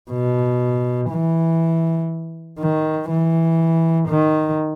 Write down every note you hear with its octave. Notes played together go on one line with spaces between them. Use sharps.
B2
E3
D#3
E3
D#3